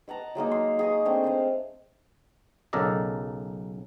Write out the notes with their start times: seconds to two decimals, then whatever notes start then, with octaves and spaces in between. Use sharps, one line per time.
0.08 D#5 F#5 A5 A#5
0.35 F#3 G#3 A#3 D#4
0.51 C6
0.79 G#4 D#5 C#6
1.05 G#3 A3 C4 D4
1.24 C5 D#5 F5
2.73 B1 C#3 A4 A#4 D5 D#5